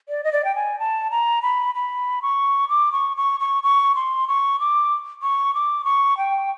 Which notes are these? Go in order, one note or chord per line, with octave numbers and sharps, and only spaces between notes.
D5
D#5
D5
G5
G#5
A5
A#5
B5
B5
C#6
D6
C#6
C#6
C#6
C#6
C6
C#6
D6
C#6
D6
C#6
G5